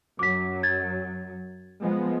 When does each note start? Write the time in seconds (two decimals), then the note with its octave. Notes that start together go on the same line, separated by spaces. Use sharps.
0.19 F#2 F#3 D6 B6
0.63 G#6 A6
1.82 F3 G#3 B3